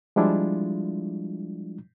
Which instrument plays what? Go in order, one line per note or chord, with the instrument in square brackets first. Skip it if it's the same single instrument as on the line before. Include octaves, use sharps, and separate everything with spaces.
[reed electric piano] F3 G3 G#3 D4 E4 F4